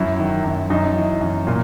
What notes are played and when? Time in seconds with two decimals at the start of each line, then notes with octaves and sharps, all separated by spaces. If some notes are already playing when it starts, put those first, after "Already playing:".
Already playing: F#2 E4
0.19 D#3
0.44 F#2
0.70 F#2 D#4
0.96 E3
1.21 F#2
1.47 A#2